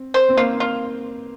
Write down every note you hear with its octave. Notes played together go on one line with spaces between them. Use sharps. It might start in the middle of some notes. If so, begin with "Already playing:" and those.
Already playing: C4
C5
C4
A#3 F4
F4